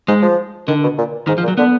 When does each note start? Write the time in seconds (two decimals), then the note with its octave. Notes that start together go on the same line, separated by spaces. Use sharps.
0.08 G#2 G#3
0.23 F3
0.68 D3 D#3
0.83 B2
0.98 A#2
1.27 G#2 D#3
1.38 F3
1.43 A#2
1.48 F#3
1.57 D3 B3